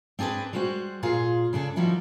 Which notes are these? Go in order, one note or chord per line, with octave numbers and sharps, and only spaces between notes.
C4 D4 G#4 A4 B4
G3 G#3 F#4 C5 F#5
A#2 F4 G#4
C#3 D4 G#4 A4
D#3 F3 G3 E4 F#4